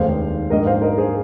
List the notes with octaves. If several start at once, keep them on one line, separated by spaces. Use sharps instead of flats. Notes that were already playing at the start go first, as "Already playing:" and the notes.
Already playing: F1 D#2 D#3 G#3 C5 F5
A#1 G#2 G#3 A#4 D#5
C5 F5
A#4 D#5
G#4 C5